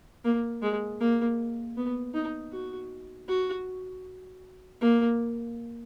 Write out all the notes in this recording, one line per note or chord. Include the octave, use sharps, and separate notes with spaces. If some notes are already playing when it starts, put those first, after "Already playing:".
A#3
G#3
A#3
B3
D#4
F#4
F#4
A#3